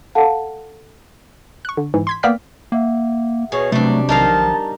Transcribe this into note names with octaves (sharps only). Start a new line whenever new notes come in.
A4 F5 F#5 A5
C#6 F#6
D3
G#2 E3
C6 G#6 B6
A#3 B3 D5 G5 F6 B6
A#3 E5 F#5
B2 G#4 C#5
C3 F#3 G3 A3 C4 D4
B1 D#3 F3 D#4 A#4 F5 A5
A5